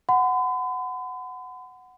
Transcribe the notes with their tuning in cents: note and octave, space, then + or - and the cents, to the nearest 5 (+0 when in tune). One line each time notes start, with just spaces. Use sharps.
F#5 +0 B5 +45